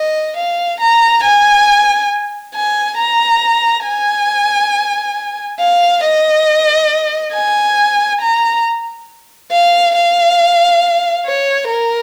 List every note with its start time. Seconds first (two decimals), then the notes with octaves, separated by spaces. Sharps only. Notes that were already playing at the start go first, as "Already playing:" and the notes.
Already playing: D#5
0.37 F5
0.81 A#5
1.25 G#5
2.55 G#5
2.98 A#5
3.86 G#5
5.60 F5
6.03 D#5
7.34 G#5
8.21 A#5
9.52 F5
9.96 F5
11.26 C#5
11.70 A#4